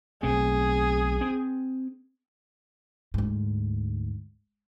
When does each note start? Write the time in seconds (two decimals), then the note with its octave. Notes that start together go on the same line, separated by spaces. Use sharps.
0.23 B1 A3 C4 G#4
1.21 C4
3.14 D2 G#2